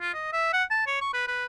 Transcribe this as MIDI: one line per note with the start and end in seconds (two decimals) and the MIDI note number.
0.01 0.12 65
0.14 0.28 75
0.33 0.50 76
0.53 0.64 78
0.71 0.85 81
0.87 0.99 73
1.01 1.09 85
1.14 1.27 71
1.28 1.46 71